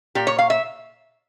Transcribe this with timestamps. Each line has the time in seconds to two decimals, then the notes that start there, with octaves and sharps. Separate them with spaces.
0.15 A#2 G4
0.27 C#5
0.39 F5
0.50 E5